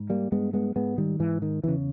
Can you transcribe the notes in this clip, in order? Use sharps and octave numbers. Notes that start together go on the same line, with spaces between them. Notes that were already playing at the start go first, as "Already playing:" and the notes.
Already playing: G#2
G3 A#3
G2 G#3 B3
G#3 B3
G#2 G#3 B3
D#3 G3
G#2 E3
D#3
E2 C#3 E3